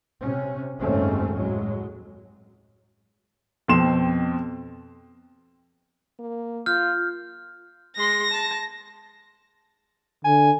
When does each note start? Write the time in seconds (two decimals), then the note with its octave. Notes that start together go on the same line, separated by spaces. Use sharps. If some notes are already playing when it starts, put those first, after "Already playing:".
0.22 C3 C#4
0.80 F#1 D#2 G#2 A3 C4 C#4
1.35 A2 F#3 G#3
3.68 F2 B2 C4 C6 E7
6.19 A#3
6.66 F4 F6 G6
7.97 G#3 C6 A#6
8.31 A5
10.25 D3 G#5